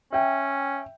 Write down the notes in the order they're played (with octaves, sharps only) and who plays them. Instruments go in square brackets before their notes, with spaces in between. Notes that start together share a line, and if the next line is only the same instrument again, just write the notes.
[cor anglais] C#4 [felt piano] E5 G5